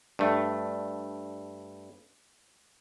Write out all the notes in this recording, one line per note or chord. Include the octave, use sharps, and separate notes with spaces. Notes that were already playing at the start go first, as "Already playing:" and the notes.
G2 A3